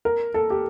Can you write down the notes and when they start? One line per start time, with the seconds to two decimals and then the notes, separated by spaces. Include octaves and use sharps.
0.05 A#4
0.34 A4
0.50 G4